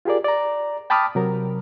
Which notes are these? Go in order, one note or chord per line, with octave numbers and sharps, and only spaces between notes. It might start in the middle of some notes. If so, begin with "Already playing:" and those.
F4 G4 G#4 A#4 D5
D5 A#5
G5 A5 B5 D6 D#6 F6
C3 F#3 A#4